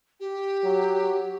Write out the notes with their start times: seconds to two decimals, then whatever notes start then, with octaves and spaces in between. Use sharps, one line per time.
0.20 G4
0.64 F#3